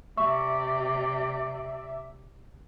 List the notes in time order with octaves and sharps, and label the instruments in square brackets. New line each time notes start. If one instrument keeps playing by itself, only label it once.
[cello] C3 D5 [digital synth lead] E5 [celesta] C#6